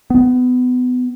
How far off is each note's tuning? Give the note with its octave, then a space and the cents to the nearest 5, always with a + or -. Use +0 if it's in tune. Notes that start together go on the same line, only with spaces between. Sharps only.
B3 +25